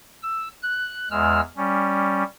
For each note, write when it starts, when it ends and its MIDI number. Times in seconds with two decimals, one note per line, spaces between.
0.22 0.48 88
0.63 1.08 90
1.11 1.41 40
1.11 1.41 56
1.11 1.41 88
1.11 1.41 89
1.57 2.23 55
1.57 2.23 61